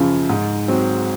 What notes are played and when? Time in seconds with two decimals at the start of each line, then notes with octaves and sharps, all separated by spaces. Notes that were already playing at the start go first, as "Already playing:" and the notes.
Already playing: F#2 C#3 F3
0.29 G#2
0.68 F#3 C4